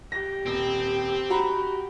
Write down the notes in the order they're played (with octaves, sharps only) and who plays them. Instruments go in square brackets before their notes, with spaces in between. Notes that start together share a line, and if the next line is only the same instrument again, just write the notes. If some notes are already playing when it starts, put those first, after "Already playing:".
[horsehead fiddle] G4 [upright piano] A#6
[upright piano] D#1 [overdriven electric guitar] C4
[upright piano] F#4 A#5 B5